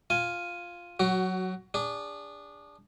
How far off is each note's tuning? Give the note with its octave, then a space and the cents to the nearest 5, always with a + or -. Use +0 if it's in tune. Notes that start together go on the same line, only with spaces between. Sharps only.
F4 +0 G#5 +0
F#3 +0 F#4 +20
D4 -15 G#4 -35